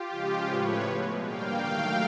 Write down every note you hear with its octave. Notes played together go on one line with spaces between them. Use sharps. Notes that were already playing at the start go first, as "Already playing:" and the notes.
Already playing: F4 G4
C#3 F3 G#3
A2 F3 A3 B4 C#5
B2 G#3
D3 G3 A#3 F5 G5
D#3 F#3 A3